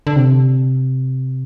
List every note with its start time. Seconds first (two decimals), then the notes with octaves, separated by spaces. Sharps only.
0.07 D3
0.16 C3